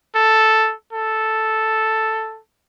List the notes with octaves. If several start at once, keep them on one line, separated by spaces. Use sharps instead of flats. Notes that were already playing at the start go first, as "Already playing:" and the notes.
A4
A4